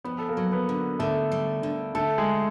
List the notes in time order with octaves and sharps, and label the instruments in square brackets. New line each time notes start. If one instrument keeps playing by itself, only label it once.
[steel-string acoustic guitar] F2 [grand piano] B3 B4
[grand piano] A4
A#3 A#4
[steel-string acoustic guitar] F#3
[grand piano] B3 B4
[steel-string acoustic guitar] D3
[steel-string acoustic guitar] D3 [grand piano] A3 A4
[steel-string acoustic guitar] G3
D3
[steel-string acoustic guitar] D3 [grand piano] A3 A4
[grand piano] G#3 G#4